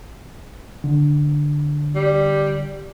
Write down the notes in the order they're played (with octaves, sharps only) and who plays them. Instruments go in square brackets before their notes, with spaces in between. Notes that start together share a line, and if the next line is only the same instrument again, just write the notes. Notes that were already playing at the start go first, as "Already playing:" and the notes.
[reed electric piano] D3
[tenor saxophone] G3